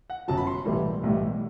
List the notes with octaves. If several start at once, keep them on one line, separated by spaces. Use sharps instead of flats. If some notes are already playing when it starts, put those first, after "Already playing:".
F#5
G1 F#2 F#3 A5
B5
C6
B1 A2 E3 G3
B1 A2 E3 G3